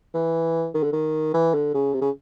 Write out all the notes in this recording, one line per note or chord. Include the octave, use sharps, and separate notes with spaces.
E3
D#3
D3
D#3
E3
D3
C#3
C3
C#3